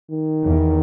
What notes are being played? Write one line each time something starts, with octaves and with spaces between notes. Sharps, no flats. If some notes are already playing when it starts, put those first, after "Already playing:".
D#3
E2